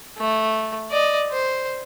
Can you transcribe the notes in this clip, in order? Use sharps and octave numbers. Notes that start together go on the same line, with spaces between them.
A3
D5 D#5
C5